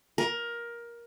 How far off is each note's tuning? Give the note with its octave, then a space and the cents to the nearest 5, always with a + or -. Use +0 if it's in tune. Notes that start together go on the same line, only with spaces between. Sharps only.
A#4 +15